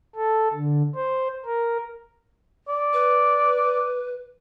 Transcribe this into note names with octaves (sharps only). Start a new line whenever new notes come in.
A4
D3
C5
A#4
D5
B4